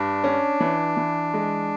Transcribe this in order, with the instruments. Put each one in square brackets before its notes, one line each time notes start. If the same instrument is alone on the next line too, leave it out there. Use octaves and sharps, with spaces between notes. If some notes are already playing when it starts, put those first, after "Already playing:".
Already playing: [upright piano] G2 [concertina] D4
[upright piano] C#4
E3
E3
G#3